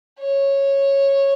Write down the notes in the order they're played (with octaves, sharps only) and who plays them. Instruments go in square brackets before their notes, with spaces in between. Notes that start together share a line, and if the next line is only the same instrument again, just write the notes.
[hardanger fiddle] C#5